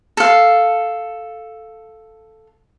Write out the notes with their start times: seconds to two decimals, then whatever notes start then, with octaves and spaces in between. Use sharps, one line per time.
0.17 A4 F5